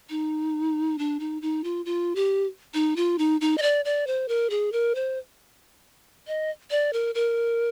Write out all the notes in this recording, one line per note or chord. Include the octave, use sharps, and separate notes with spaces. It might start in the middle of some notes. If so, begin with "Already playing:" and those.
D#4
D4
D#4
D#4
F4
F4
G4
D#4
F4
D#4
D#4
D#5
D5
D5
C5
A#4
G#4
A#4
C5
D#5
D5
A#4
A#4